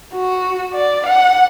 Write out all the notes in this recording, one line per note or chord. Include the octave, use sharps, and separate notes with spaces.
F#4
D5
F#5